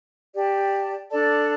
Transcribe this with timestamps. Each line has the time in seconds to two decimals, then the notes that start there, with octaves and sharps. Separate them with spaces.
0.34 G4 D5 A5
1.10 D4 A4 D5 A5